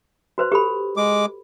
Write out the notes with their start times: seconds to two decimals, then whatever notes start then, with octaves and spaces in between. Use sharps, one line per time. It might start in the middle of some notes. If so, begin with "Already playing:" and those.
0.38 F#4 B4 C5
0.52 G4 A4 B5
0.97 G#3 D6